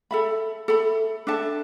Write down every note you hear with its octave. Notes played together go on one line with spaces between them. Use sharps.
A4 E5 B5
A4 E5 B5
D4 A4 E5 A5